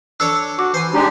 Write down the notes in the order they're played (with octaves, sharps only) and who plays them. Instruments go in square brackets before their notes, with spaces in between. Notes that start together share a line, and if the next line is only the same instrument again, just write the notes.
[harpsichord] D4 A4 C#5 [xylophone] E6
[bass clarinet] F#4 [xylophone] D6
[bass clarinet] E3 [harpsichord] C5 G#5
[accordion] G#3 D4 G4 [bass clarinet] D#4